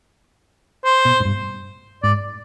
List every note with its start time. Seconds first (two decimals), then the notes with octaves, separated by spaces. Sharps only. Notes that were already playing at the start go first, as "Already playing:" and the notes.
0.85 C5
1.05 B2
1.20 G#2
1.25 G2
2.03 G#2 D5